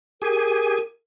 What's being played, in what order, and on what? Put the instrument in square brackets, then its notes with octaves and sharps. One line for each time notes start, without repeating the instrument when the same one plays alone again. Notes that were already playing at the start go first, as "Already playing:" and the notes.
[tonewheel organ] G4 G#4 G#5 [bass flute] A#4